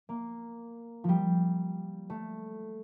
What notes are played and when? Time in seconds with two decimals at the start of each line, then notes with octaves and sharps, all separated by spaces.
0.09 A#3
1.04 F3 G3
2.10 A3